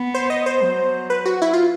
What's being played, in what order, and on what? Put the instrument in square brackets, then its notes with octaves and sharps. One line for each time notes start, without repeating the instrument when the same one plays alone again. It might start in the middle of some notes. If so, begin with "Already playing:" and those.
Already playing: [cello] B3
[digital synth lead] C5
D#5
C5
[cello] F#3
[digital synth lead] B4
F#4
E4
F4